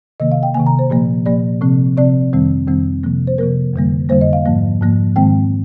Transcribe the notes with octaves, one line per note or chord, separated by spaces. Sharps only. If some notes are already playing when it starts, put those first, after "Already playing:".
C3 D#3 A#3 D#5
F5
G5
C3 D#3 A#3 G#5
A#5
C5
A#2 F3 A#3
A#2 F3 A#3 D5
C3 F3 C4
C3 F3 C4 D5
F2 D#3 G3 C4
F2 D#3 G3 C4
C3 F3 A#3
C5
C3 F3 A#3 A#4
F2 D3 G3 A#3
F2 D3 G3 A#3 C5
D#5
F5
G#2 F3 A#3
G#2 F3 A#3
G#2 D#3 G#3 C4 G5